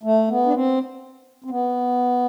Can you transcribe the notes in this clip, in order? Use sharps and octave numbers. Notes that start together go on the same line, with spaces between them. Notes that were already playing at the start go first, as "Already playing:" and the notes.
A3
B3
D4
C4
C4
B3